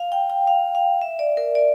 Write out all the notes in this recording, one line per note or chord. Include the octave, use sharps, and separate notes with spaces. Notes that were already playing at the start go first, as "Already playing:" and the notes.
Already playing: F5
G5
G5
F5
F5
E5
D5
A#4
D5